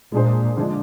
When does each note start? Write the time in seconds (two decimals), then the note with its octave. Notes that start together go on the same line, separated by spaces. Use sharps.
0.12 A#2 G#3 D4 G#4 C5
0.57 D3 F3 G#3 D4